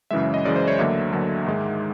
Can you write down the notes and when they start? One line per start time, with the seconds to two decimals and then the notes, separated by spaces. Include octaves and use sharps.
0.11 F#2 C#3 E3 G#3 E5
0.23 E5
0.34 D#5
0.45 F#2 C#3 E3 G#3 D5
0.56 C5
0.68 C#5
0.79 D2 D3 F#3 A#3 E5
1.12 D2 D3 F#3 A#3
1.46 G#2 D#3 G#3